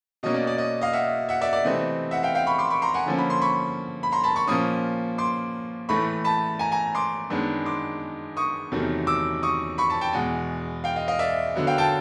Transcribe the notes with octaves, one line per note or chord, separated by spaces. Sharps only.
B2 F#3 A#3 C#4 D#5
D5
D5
D#5
D#5 F5
E5 F#5
E5 F#5
D5 E5
D5
C3 E3 A3 C4 D#5
E5 F#5
F5 G5
F5 G5
B5 C#6
C6 D6
B5 C#6
A#5 C6
F#5 G#5
D3 F3 A#3 C#4
B5
C6
B5 C#6
B5
A#5 C6
A5 B5
B5 C#6
A#2 F3 A#3 C#4 C#6 D#6
C6 D6
A2 E3 A3 B5 C#6
A5 B5
G#5 A#5
G#5 A#5
C6 D6
F#2 D#3 G#3 B3 D4
C6 D6
C#6 D#6
E2 C3 D#3 F#3 A3
D6 E6
C#6 D#6
B5 C#6
A5 B5
G5 A5
E2 B2 G#3 F#5 G#5
F5 G5
D#5 F5
D#5 F5
D5 E5
D3 F#3 B3
F5 G5
G5 A5